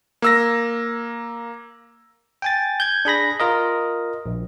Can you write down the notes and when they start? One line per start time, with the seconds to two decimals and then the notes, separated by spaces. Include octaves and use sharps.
0.22 A#3 E6 A#6
2.42 G5 G#5 A6
2.80 G6 G#6
3.05 D4 G#4 B5 A#6
3.40 F4 A#4 D#5
4.26 A#1